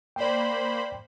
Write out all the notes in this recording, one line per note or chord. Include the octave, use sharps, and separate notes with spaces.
A#3 C5 D5 G5 B5